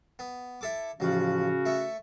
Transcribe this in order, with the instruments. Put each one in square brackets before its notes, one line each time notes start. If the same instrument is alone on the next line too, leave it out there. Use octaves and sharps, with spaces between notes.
[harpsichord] B3
E4 A4 D6
[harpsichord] A1 F3 [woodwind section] C#3 C#4 F#4
[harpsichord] A3 E5 C#6